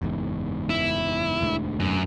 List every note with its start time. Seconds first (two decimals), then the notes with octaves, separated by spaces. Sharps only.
0.02 F#1 E2 G#2
0.70 E4
1.41 E1 D2 G#2
1.80 F#2